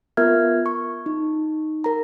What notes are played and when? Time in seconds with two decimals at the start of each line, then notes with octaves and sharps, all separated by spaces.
0.17 B3 F4 A#4 E5 F6 G#6
0.66 C#6
1.06 D#4
1.84 A#4 A#5